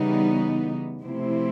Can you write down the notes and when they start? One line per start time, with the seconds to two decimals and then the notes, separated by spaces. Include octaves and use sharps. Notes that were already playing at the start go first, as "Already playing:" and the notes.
Already playing: C#3 E3 G3 B3 D#4
1.02 C3 F3 A3 C4 E4